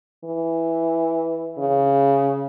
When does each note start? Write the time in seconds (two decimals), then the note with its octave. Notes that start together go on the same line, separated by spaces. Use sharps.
0.24 E3
1.58 C#3